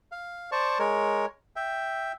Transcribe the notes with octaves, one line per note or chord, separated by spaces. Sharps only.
F5
C5 D5 A5 C#6
G#3 A#4 C#5
E5 G5